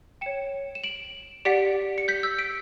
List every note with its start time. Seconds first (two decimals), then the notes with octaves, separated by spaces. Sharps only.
0.21 C#5 G5 C#7 E7
0.75 E7
0.84 D7 F#7
1.45 G4 D5 F#5 B6 D7
1.98 C#7
2.08 G6 B6
2.23 E6 G6
2.38 B6 D7